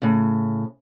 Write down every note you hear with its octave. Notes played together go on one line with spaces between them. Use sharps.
A2 C#3